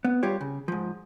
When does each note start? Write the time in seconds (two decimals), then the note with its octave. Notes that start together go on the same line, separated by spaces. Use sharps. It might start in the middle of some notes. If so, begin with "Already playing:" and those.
0.05 B3
0.23 G3 F4 G4 C#5
0.41 C#3
0.68 G#2 F3